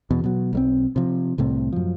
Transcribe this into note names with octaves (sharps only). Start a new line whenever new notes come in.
E2 B2
B2 F#3
B1 G3 C4
C3 F3
C2 A2 C3
F#2 F3